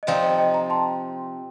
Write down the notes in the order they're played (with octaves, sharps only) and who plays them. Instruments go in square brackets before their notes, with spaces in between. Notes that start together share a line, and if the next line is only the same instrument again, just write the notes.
[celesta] D#5
[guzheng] C3 F3 C4 D#4 [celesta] D5 F5
[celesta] D#5 G5
D#5 G5
G5 A#5
A5 C6